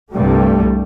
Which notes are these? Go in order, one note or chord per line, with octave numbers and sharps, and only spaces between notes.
C2 G2 G3 A3